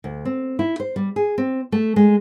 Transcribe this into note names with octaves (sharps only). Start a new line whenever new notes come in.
D2
C4
E4
C5
G3
G#4
C4
A3
G#3